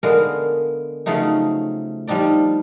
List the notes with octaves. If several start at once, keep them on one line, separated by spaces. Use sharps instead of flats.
D3 G#3 A#3 B3 A#4
C#3 F3 F#3 A3 D#4
F3 G3 D4 D#4 D5